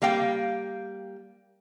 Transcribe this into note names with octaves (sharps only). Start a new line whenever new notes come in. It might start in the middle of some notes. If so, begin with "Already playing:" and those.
G3 A#3 F5 G5